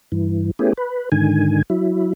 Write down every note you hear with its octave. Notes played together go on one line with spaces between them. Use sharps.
G2 E3
A3 B3 C#4 E4 G4 G#4
B4
G#2 D3 D#3 G#5
F#3 E4